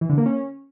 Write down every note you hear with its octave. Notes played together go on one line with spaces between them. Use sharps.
E3
D3
A#3
C#4